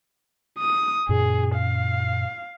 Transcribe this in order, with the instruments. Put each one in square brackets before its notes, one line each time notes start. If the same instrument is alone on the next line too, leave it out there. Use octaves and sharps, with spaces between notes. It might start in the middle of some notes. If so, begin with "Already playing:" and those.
[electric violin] D#6
[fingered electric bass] F#2 A#2 C#3 [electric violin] G#4
[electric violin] F5